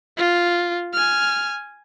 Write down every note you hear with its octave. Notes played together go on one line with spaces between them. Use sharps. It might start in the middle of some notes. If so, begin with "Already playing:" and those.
F4
G#5 F6